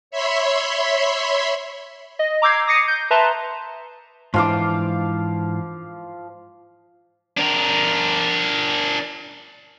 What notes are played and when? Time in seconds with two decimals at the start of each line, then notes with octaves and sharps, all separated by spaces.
0.11 C#5 E5 B5 C6
2.19 D#5
2.42 A#5 D6 E6 G6 G#6 C7
2.67 D6 D#6 A#6 C7 C#7 D#7
2.88 G6
3.11 B4 E5 A5 A#5 C6
4.34 G#2 E3 F3 D4 F5 D6
7.37 D4 A#4